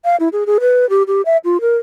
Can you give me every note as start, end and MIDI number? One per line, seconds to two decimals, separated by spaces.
0.05 0.16 77
0.20 0.29 64
0.33 0.44 68
0.46 0.58 68
0.61 0.88 71
0.90 1.03 67
1.07 1.22 67
1.26 1.37 76
1.44 1.61 65
1.61 1.77 70